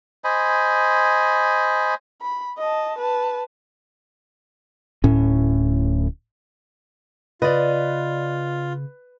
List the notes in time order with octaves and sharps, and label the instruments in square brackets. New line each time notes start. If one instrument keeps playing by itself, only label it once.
[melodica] C5 D#5 G#5 B5
[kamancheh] B5
D#5 A5
B4 A5
[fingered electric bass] D1 A2 C#4
[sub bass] C#3 [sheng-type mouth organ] F4 [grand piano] B4 [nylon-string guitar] D5 D#5